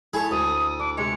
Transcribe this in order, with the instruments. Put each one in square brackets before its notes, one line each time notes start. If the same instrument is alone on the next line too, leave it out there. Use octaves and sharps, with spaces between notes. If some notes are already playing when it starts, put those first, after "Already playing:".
[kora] E4 A4 C#5 [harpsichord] G#4
[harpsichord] D2 [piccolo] D#6
[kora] D4 [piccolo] D6
[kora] C3 G#3 C#5 [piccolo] C#7